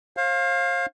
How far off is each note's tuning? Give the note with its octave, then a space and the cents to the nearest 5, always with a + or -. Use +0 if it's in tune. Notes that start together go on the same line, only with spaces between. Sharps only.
C5 +45 F5 +10